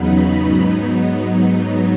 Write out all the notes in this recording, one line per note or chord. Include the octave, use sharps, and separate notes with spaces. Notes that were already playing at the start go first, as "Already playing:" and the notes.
Already playing: E2 C#3 F#3 B3 D#4 B5
G#2 F#3 B3 D#4